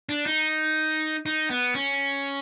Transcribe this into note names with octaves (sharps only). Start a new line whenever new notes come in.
D4
D#4
D#4
B3
C#4